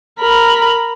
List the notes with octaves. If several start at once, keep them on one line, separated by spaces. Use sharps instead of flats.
A#4 B5